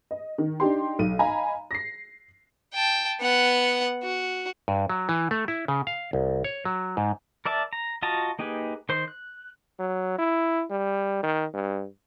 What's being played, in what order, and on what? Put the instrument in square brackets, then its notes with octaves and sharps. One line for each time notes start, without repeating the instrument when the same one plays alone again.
[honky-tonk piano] D#5
D#3
D4 D#4 G4 C6
B1 D#7
D#5 F5 G#5 A#5 B5
A#6 C7
[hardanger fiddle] G5 A5
B3 F#5
F#4
[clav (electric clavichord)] G2
F#3
E3
A3
E4
C#3
F5
C2
C#5
F#3
G#2
[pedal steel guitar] A#4 D5 E5 A5
A#5
F4 F#4 D#5 A5 A#5
A#3 D#4 G4 G#4 B4
D#3 C5 C6
F#6
[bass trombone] F#3
E4
G3
D#3
G2